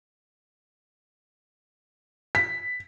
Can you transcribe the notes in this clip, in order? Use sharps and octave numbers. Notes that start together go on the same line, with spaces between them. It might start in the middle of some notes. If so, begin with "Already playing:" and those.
B6